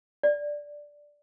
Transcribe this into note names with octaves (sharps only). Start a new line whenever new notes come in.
D5